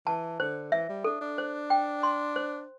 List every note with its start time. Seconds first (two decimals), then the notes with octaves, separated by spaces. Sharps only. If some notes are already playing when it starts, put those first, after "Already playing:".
0.07 E3 A5
0.40 D3 C5
0.72 E3 E5
0.89 G3
1.04 D4 A4
1.21 D4
1.38 C5
1.70 G5
2.03 C6
2.36 C5